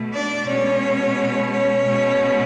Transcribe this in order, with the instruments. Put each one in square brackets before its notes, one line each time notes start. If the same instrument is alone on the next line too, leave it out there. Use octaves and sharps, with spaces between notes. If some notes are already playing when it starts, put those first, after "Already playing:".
Already playing: [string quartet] B2 A3
D4 D5
B2 G#3 C#4 C#5
C#4 C#5
B2 G#3